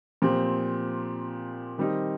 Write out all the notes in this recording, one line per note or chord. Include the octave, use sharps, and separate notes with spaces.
A#2 F3 C4 G4
D#3 G3 C4 D#4